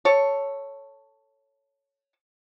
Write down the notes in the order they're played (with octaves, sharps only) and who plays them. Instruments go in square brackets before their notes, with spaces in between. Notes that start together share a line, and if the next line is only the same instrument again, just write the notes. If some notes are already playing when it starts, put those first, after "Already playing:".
[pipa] A4 C#5